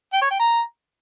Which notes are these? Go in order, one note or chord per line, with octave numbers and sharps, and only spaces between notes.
G5
C#5
G5
A#5